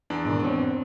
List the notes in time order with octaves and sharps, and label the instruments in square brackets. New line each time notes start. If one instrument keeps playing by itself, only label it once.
[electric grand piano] E2 D4 D5
[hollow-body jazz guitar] G#2 B2 D#3
B3 C4 C#5